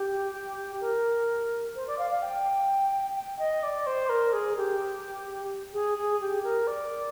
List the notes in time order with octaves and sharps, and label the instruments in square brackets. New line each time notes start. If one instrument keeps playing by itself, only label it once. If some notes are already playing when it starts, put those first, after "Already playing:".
Already playing: [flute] G4
A#4
C5
D5
F5
F5
G5
G5
D#5
D5
C5
A#4
G#4
G4
G#4
G#4
G4
A#4
D5